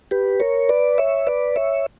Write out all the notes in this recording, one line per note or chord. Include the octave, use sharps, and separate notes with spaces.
G4 B4
A#4 C#5
B4 D5
C#5 E5
B4 D5
C#5 E5